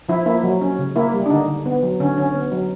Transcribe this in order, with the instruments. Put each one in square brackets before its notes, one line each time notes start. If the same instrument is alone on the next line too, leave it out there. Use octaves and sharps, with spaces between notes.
[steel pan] F3 E4
A#3 E4
F#3
C#4
C#3
A#3 E4
G3
D4
D3 D#4
D3
B3
F#3
D3 C#4
D3 C#4
B3
F#3